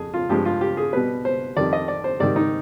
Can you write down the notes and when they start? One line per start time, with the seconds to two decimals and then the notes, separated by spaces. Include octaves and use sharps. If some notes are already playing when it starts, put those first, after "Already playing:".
Already playing: F2 G#4
0.14 F4
0.29 G2 F3 G#3 G4
0.45 F4
0.61 G4
0.77 G#4
0.93 B2 G3 B4
1.25 C5
1.56 F2 D#3 G3 D5
1.73 D#5
1.88 D5
2.04 C5
2.20 G#2 D#3 G3 D5
2.36 D#4